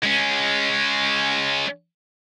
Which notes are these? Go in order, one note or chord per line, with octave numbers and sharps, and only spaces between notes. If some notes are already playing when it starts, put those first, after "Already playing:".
G#3 C#4